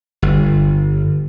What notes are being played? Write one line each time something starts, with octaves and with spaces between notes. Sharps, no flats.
G1